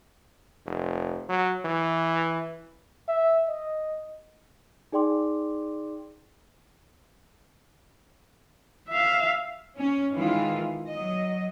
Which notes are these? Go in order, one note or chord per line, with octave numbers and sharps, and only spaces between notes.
F1
F#3
E3
E5
D#5
D#4 G#4 D5 G5 C6 D6
E5 F5
C#4
D#3 E3 G#3 F4
F#3 D#5